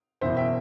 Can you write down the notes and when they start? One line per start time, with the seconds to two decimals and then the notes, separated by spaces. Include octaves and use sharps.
0.21 F#1 E2 B2 C5 E5
0.37 E5 G5